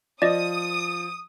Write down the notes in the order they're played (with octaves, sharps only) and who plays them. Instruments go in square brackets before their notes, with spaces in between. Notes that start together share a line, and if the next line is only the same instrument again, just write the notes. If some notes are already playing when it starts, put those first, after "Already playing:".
[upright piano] F3 [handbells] D5 D#5 [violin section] D#6